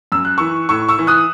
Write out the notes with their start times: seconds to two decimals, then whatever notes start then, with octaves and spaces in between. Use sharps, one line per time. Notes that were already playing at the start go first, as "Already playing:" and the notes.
0.12 F#2 E6
0.25 F#6
0.38 E3 C#6 E6
0.69 A2 C#6 E6
0.89 C#6 E6
0.99 E3
1.07 D#6 F#6